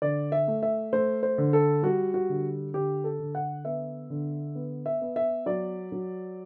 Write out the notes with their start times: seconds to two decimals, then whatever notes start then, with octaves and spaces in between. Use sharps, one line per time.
0.02 D3 D5
0.32 E5
0.48 A3
0.63 E5
0.93 A3 C5
1.23 C5
1.38 D3
1.53 A4
1.83 G3 F#4
2.14 F#4
2.29 D3
2.74 D3 G4
3.04 A4
3.20 D3
3.35 F#5
3.65 B3 E5
4.10 D3
4.55 B3
4.86 E5
5.01 B3
5.16 E5
5.46 F#3 D5
5.92 F#3